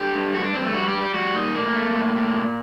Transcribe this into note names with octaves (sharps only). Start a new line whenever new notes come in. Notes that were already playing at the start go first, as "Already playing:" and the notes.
Already playing: D3 G4
G2
G2 F#4
D4
G2 C4
A3
G3 F#4
G4
G3
G4
G3 F#4
A#2 D#4
A2 A#3
A3
A2
A2
A#2